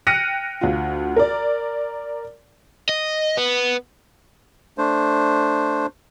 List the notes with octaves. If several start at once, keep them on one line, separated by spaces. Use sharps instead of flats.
G5 F6 F#6 A#6 C#7 D#7
D2 F4
A#4 D5
D#5
B3
A3 D4 C5